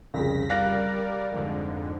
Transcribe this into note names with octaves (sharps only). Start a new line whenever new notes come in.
C2 F2 C#3 A#6 B6
G3 A#4 D5 F5 F#6 A#6
F2 G#2 D3